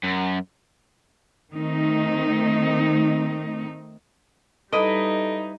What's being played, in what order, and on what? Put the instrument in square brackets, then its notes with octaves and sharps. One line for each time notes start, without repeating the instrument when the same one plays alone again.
[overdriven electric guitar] F#2
[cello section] D#3 A3 C4 D#4
[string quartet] G3 D#4 [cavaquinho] E4 B4 D#5 [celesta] A4 A5 D7